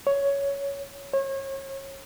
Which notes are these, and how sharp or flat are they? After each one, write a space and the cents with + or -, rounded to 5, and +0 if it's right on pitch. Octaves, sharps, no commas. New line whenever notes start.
C#5 +10
C#5 -35